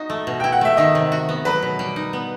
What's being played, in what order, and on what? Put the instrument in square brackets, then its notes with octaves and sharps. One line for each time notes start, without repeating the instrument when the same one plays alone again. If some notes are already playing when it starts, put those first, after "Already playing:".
Already playing: [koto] D#4 F#4 [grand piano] D#5
[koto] A3
B2
[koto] E4 [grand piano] G5
[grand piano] F#5
[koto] A3 [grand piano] E5
[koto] D#3 [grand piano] D#5
[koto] C3
F#4
B3
[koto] F#3 [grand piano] B4
[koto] B2
G3
D#4
B3